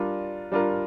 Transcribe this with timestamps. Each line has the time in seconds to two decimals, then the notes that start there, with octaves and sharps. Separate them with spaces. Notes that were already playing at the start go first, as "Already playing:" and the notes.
Already playing: G3 D4 F4 A#4
0.52 G3 D4 F4 A#4